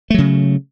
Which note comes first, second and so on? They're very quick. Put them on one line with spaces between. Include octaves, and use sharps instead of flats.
A3 F#3 C#3